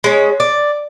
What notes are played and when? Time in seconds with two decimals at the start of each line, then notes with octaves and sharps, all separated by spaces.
0.04 G#3 C#4
0.40 D5